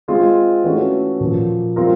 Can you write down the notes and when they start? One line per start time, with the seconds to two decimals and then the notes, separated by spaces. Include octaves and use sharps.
0.08 G#3 C4 F4 G#4
0.64 E3 A3 C#4 F#4 B4
1.20 A#2 F3 A#3
1.76 G3 C4 F4 A#4